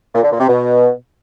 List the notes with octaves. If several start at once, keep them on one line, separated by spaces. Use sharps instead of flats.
A#2
D3
A#2
C3
B2